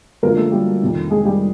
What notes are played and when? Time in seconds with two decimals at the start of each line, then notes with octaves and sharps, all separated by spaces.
0.23 F#2 D3 F3 G#3 A#3 A#4
0.37 A3 A4
0.52 G3 G4
0.81 F2 C3 D#3
1.11 G#3 G#4
1.25 G3 G4